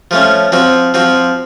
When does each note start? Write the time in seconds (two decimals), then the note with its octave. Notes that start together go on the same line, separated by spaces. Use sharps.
0.11 F3 A3 C#4
0.52 F3 C4 F#4
0.94 F3 C4 F#4